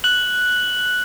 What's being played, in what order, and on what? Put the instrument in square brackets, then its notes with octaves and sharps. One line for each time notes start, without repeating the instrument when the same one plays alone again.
[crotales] F#6 F#7